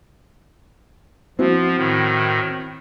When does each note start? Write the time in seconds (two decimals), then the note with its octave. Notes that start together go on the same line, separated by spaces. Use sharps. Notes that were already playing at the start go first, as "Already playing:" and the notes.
1.39 F3 C4 E4 F#4
1.76 A2 D#3